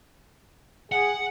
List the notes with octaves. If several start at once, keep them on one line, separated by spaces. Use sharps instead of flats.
G#4 F#5